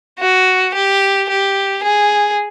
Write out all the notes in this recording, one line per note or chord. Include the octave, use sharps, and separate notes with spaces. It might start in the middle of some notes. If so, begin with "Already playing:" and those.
F#4
G4
G4
G#4